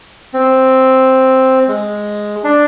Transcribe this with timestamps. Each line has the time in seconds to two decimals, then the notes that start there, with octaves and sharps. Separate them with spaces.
0.34 C4
1.68 G#3
2.44 D4